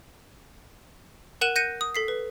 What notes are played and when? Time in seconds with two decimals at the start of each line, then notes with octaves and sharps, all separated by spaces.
1.41 A#4 F#5 F#6 D#7 E7 F#7
1.56 F#6 G6 A#6 C#7 D#7
1.81 D#6
1.95 A4 B6 C7
2.08 B4